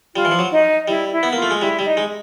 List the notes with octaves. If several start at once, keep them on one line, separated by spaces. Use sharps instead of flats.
G3 F4
E3
F3
F#3
D#4
G3 E4
E4
B3
A#3 F4
A3
G#3
G3 E4
G3
D#4
G#3